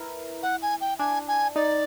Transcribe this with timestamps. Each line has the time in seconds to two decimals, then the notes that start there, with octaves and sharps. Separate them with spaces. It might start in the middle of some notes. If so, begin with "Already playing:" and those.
Already playing: E4 A#4 B4
0.43 F#5
0.62 G#5
0.81 G5
0.99 D4 G#5
1.28 G#5
1.56 D#4 D5